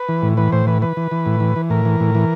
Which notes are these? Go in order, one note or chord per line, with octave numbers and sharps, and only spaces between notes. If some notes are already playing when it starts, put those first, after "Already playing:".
Already playing: B4
E3
A2
E3 B4
A2 C5
E3 B4
E3 B4
E3
E3
A2
E3
E3
A2 A#4
E3
A2
E3